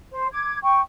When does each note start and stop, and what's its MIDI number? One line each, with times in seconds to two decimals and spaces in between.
0.13 0.27 72
0.32 0.57 86
0.32 0.57 92
0.62 0.80 79
0.62 0.80 85